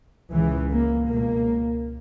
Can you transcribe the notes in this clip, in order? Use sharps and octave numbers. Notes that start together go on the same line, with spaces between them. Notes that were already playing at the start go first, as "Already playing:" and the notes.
C#2 C#3 E3
A#3
C#2 B2 A#3